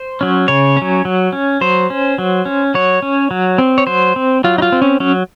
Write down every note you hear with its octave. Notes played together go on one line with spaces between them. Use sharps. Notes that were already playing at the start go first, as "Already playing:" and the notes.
Already playing: C5
F#3 C#4
C#3 C#5
C#4
F#3
F#3
C#4
F#3 C5
C#4
F#3
C#4
F#3 C#5
C#4
F#3
C4
C#5
F#3 C5
C4
F#3 F4
D#4
F4
C4
C#4
F#3 C#4